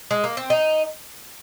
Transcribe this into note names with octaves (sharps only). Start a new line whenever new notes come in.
G#3
A#3
C4
D#4